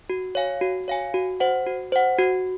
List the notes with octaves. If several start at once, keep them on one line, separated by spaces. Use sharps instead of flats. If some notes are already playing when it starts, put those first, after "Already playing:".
F#4
C#5 F5 G#5
F#4
C#5 F5 G#5
F#4
C5 F#5
F#4
C5 F#5
F#4